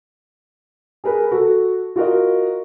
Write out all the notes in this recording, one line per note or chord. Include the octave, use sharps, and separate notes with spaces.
G#4 A#4 B4
F#4 A4
F4 F#4 A#4 D#5